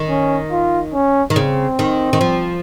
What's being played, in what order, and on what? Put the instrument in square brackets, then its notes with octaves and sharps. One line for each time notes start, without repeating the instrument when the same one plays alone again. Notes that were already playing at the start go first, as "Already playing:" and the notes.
Already playing: [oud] D#3
[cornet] C#4
F4
C#4
[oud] D#3
[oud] C#3 [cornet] C4
[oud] D#3
D#3
F3